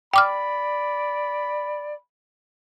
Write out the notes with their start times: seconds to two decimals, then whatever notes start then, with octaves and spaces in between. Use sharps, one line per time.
0.14 D5 G5 B5 D6 F6